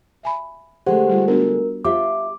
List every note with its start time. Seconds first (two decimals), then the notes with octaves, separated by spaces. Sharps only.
0.23 E5 G#5 B5
0.87 D3 G#3 A3 G4 C5 F#5
1.09 G3 F4
1.28 B3 D4 F#4 A#4
1.85 F4 G4 C5 E5 D6